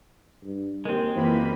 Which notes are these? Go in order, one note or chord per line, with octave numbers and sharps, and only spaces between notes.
G2
D#2 D#3 G#3 C4
F#2 E3 F3 A#3 B5